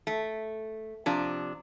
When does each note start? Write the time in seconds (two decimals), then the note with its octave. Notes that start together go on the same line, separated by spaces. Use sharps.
0.07 A3
1.06 C3 F3 D4